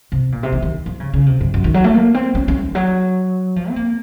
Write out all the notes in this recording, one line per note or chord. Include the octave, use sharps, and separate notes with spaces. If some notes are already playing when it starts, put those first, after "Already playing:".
C3
A#2
C3
D#3
D#3
F3
C#3
C#3
C3
F#2
F#2
D#3
F#3
A3
A#3
C4
C#4
C#4
D#3
F#3
F3
C4
A#3